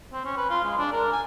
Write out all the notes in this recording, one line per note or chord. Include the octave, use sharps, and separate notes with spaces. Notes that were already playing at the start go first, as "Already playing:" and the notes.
C4
C#4
B4
F4
G#3
D4
A#4
G#5